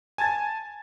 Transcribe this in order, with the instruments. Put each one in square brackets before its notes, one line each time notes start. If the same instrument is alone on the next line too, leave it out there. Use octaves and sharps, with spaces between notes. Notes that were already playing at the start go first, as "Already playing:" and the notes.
[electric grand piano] G#5 A5 G#6 A6